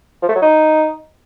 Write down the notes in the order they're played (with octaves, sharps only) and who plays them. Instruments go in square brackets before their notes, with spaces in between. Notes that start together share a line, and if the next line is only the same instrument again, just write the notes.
[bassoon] F3
A3
F#3
D#4